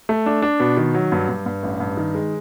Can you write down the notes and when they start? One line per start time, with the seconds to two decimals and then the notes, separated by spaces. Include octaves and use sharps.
0.09 A3
0.26 D4
0.42 D4
0.60 B2
0.77 D#3
0.94 F#3
1.12 G2
1.29 G2
1.46 G2
1.63 A1
1.80 G2
1.97 D#3
2.15 G#3